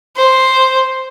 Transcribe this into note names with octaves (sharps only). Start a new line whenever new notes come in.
C5